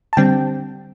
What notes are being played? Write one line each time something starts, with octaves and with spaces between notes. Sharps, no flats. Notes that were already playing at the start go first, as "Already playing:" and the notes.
A5
D3 G3 C4 G5